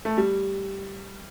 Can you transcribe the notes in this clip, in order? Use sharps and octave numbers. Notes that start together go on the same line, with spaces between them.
A3
G3